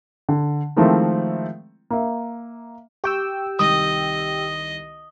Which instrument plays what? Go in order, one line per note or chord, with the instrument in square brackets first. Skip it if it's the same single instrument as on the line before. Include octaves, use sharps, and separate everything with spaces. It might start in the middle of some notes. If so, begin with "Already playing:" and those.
[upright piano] D3
D#3 F3 G#3 A3 C4 E4
A#3 E5
[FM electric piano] G4 G5 E6 [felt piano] C#6
[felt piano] C2 D#3 [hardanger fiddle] D#5 [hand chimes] D#6